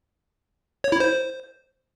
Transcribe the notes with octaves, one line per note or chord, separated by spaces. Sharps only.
C#5
E4
C5